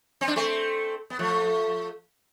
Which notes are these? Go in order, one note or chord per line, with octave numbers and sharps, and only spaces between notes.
C4
D4
A3 C4
B3
F3 A3